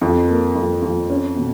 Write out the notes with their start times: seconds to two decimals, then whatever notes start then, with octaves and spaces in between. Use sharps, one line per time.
0.01 F2
0.29 A#3
0.55 F2
0.82 F2
1.09 C#4
1.36 B2